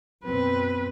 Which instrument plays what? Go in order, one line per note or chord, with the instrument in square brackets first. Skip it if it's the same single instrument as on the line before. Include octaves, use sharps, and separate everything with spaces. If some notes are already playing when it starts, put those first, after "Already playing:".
[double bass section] F#2 B2 C4 [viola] B4